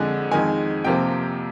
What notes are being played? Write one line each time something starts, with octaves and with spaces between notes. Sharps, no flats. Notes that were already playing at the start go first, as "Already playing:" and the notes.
Already playing: F2 D3 G#3 G#5
F2 D#3 G#3 G#5
F2 C3 F3 A#3 G5